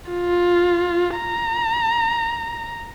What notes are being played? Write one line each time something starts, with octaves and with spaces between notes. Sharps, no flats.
F4
A#5